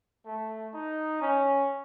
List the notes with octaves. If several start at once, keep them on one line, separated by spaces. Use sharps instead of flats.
A3
D#4
C#4